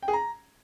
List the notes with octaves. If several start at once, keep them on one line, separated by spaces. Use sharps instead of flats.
G5
G#4
A#5